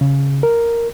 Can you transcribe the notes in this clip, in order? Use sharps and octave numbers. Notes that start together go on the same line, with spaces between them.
C#3
A#4